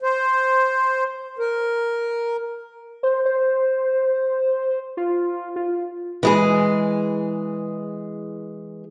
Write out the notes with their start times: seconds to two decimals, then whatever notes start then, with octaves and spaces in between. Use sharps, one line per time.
0.02 C5
1.39 A#4
3.03 C5
3.25 C5
4.97 F4
5.56 F4
6.23 E3 G#3 G#4